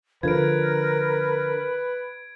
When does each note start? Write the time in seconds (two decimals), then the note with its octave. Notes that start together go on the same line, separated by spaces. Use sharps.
0.23 D3 F3 A#4 B4 G#6 D7